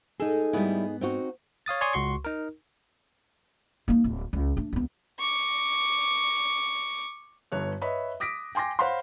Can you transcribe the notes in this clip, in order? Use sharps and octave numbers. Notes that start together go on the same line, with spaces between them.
D#4 G#4 A4
G#2 G3 B3 E4
C4 D#4 F#4
C#5 F5 D#6 A6
C#5 D5 G#5 C6 C#6 D#6
C#2 F#4 C6 C#6
D#4 A#4
A#3 D#4
D1
C#2
A3 D4
D2 B3
C#6 D6
G1 G2 C#5 F#6
B4 C#5 D#5 E5 B5
D6 D#6 A#6 B6 D7
G5 G#5 C6 D6 A#6
C5 C#5 F5 F#5 B5 C6